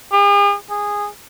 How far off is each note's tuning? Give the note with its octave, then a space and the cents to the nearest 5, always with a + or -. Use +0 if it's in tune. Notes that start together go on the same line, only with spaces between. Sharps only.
G#4 -45
G#4 -15